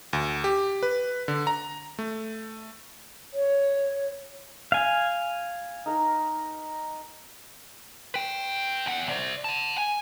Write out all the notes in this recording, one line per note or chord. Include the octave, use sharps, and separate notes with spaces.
D2
G4
B4
D3
A#5
A3
C#5
F5 G#5
D#4 A#4
B4 G5
E2 F#5
C5 D5
F#5 A5
G#5